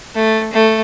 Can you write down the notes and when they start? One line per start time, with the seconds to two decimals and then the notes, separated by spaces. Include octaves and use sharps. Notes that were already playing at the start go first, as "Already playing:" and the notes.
0.15 A3
0.53 A3